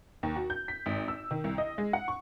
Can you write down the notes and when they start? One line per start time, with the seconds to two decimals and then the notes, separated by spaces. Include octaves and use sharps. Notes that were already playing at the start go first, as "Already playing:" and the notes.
0.23 D#2
0.36 F#4
0.50 G6
0.68 B6
0.86 G#1
1.08 E6
1.31 D#3
1.44 C2
1.58 D#5
1.78 G#3
1.93 F#5
2.08 C#6